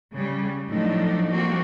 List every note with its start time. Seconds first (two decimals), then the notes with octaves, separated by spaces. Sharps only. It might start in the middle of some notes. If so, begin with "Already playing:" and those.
0.14 C#3 G3
0.67 A2 F3 F#3 A3 D4 D#4
1.31 F3 G3 A#3 C4 F#4